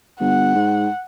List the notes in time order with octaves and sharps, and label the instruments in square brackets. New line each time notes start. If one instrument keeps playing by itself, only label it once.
[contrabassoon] G1 [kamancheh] F#5
[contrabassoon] G#2